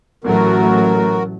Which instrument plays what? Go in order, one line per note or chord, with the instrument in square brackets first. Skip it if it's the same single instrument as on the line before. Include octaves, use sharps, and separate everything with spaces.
[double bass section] A1 F#3 A3 [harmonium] F#4 A#4